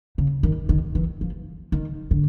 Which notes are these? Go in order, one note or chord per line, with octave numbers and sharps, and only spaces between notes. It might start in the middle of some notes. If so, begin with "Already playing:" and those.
C#3
D#3
D#3
E3
F3
D#3
D3